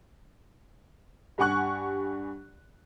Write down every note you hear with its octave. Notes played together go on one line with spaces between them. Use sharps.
G2 G4 F#5 G#5 C#6 F#6